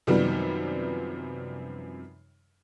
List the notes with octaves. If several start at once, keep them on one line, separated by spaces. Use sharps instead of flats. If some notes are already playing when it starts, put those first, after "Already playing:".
F#2 C3 D#3 F3 G3 B3